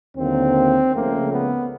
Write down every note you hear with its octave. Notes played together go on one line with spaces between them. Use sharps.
D#2 D3 F#3 A#3 C4
C#2 C#3 F3 A3 A#3
B3